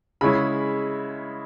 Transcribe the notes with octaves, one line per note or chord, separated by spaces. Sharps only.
C#3 G#3 C#4 E4 B5